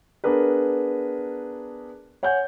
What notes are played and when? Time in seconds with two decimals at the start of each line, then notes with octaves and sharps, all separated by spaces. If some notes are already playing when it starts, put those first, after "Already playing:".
0.24 B3 D4 G#4 A#4 B4
2.23 C#5 F#5 G#5 G6